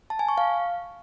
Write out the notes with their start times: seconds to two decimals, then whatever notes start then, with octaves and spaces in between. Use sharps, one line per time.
0.10 A5
0.19 G#5
0.28 C#6
0.38 F5